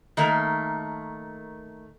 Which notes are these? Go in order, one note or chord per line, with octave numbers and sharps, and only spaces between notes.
D#3 A3 A#3